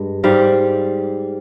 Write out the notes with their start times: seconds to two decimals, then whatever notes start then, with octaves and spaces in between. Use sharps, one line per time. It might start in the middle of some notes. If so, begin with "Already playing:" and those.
Already playing: G2 G#3
0.24 G#2 G3 F5